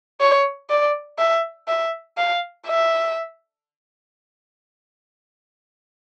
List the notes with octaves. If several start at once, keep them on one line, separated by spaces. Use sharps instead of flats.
C#5
D5
E5
E5
F5
E5